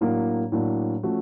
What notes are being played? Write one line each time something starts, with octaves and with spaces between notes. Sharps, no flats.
A2 F#3 A#3 D4
A2 F#3 A#3 D4
F3 A3 C#4 F#4